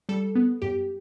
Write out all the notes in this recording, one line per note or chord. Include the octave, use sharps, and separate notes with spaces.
G3 A4
B3
F#2 G4